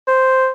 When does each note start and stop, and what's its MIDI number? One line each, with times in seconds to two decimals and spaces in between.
0.08 0.50 72